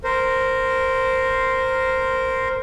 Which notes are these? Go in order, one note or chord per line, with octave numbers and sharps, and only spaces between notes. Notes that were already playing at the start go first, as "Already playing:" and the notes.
A#4 C5